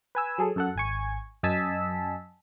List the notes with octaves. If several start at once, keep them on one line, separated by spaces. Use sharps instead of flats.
B4 G#5 E6
F#3 G#4 A4
F#2 A4 F#5
G#1 G#5 C#6
F#2 D#5 G#5 A5 E6 B6